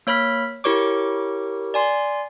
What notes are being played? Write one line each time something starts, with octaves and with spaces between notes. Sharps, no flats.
A#3 C#5 B5 F6 B6
E4 G4 A#4 C#5 C#6 D6
D5 G#5 C6